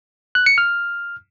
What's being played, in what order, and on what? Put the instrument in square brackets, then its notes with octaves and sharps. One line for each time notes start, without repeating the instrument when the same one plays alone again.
[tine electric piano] F#6
C#7
F6